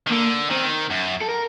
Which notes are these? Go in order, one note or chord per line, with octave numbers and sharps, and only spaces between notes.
D#3
D3 A#3
D#3 C4
F#2
A4
A#4